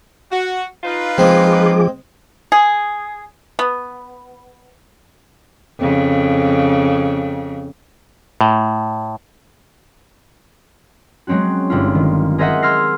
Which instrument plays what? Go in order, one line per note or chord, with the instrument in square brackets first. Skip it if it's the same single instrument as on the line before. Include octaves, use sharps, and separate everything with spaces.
[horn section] F#4
D#4 F4 B4
[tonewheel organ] F3 G#4 D6 [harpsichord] G#3 C4
[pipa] G#4
B3
[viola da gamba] F2 C#3
[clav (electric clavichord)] A2
[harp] F#3 G#3 C4 C#4 F#4
G1 E4 F4
D#3
G#4 A#4 C5 D#5 E5 F#5
C6 E6 F6 G#6 A#6 C7